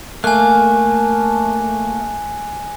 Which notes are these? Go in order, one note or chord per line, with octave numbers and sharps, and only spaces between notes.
A3 A#3 G#5 F#6